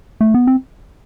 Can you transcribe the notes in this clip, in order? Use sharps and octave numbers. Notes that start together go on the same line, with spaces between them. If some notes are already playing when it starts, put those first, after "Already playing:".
A3
B3
C4